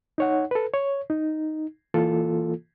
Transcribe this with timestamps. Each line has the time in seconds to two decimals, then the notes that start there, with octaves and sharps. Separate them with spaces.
0.18 D#4 C#5 F#5
0.51 A4 B4
0.74 C#5
1.10 D#4
1.94 E3 A#3 F4 A4